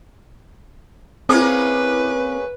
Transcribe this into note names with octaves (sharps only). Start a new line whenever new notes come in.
A#3 C4 C#4 E4 G#4 B4 D6